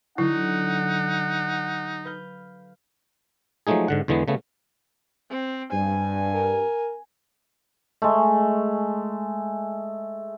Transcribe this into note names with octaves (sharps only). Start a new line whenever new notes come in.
D3 F#3 D#4 E4 F#5
B4 F5 G6
F3 F#3 G#3 A3 D#4 G#4
G#2 D3 F#5
E2 D3 E3 G#3 B3
C#3 A3 B3
C4
G2 G#5
A#4
G#3 A3